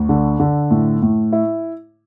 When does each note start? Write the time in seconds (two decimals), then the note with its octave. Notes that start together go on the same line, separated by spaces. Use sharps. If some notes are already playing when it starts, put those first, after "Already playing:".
Already playing: D2
0.09 D3
0.40 D3
0.71 A2
1.02 A2
1.33 E4